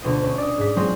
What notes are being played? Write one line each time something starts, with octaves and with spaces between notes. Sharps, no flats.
D2 B2 F4 D#5
C#4
D5 D#6
G#2 B6
F#3 G#3 C4 F4